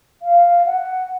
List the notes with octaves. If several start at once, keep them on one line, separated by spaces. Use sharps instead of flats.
F5
F#5